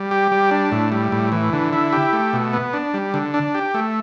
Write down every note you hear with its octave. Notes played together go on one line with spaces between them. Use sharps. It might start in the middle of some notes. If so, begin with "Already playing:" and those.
Already playing: G3
G4
G3
D4
A2
G3
A2
E3
D3
E4
G4
A3
B2
B3
D4
G3
D3
D4
G4
A3